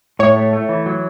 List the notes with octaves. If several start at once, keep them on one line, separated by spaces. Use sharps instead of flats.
A2 C#5
A3
A3
E3
F#3